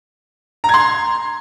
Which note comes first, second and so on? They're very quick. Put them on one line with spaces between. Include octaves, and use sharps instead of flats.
A#5 G#6 C6